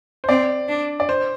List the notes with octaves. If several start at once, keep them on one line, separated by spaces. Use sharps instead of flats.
C5
C4 D5
D4
D5
C5